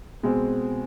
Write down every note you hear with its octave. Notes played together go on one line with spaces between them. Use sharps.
B2 G#3 C4